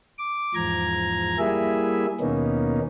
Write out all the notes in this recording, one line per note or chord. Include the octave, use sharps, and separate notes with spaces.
D6
E2 G#2 F3 A#5 G#6
G3 A#3 E4 G#4 E5
D#2 B2 A#3 B3 C#4 D#4